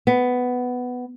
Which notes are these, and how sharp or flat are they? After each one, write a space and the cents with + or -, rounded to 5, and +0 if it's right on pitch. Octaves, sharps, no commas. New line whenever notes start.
B3 +10